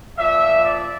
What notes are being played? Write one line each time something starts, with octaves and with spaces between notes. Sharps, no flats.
A#2 F3 E5
D5